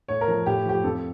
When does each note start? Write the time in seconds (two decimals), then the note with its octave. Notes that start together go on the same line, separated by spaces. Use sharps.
0.08 A2 C#5
0.21 A#4
0.28 F3
0.46 A2 G4
0.66 F3 G4
0.84 F2 A4